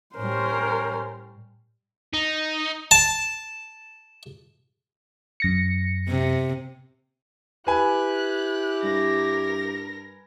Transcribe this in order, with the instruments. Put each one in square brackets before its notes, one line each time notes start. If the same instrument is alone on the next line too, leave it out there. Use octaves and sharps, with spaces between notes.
[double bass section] A2 G3 [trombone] C#4 [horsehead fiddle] A#4 C5
[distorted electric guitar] D#4
[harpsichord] A5
[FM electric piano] F#2 A#6 C#7
[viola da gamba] C3
[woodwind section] E4 G4 [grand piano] B4 G#5 [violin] F#6
[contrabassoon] G2 [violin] A#4 A#6